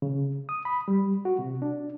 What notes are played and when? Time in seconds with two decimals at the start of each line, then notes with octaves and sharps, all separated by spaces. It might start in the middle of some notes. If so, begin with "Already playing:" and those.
0.02 C#3
0.49 D#6
0.65 B5
0.88 G3
1.25 F#4
1.39 C3
1.62 D4